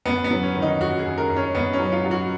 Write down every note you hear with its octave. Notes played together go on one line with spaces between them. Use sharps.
F#2 B3
B3
F#3
C#4
D#3
D#4
F#2 F#4
G#4
F#2
A#4
F#2
C#4
F#2 B3
C#4
F#3
F4
F#3
F#4